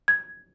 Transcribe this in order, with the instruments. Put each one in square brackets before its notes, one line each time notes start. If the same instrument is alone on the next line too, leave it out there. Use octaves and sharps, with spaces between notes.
[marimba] G#6